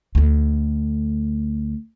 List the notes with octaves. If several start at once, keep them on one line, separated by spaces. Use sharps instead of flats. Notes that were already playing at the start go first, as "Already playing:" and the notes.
D2 A3